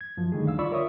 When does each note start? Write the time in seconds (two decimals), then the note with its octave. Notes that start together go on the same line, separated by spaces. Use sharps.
0.01 G#6
0.17 F#2 F3
0.32 D3 D#3 G3 A3 G#4
0.45 D2 D3 F5 E6
0.59 F4 D5 B5 C#6 E6
0.71 F4 A#4 C#5 E5 C#6 D#6